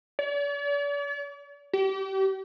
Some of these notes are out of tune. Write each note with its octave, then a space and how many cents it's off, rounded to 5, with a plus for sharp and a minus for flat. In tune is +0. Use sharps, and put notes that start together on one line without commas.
D5 -45
G4 -35